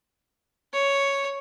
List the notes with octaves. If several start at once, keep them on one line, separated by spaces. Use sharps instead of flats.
C#5